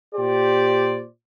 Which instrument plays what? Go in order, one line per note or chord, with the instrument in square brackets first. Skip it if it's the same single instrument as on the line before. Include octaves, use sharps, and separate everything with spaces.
[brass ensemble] A#2 G4 C5 D5